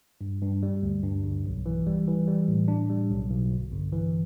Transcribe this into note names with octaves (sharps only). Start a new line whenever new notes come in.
G2
G2
G3
D2
G2
G1
B1
E3
G3
E3
G3
A2
D4
G3
B1
B1
G1
G1
E3